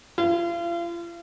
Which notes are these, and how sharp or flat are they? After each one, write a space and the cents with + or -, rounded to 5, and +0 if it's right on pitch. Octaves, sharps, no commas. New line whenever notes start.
F4 -40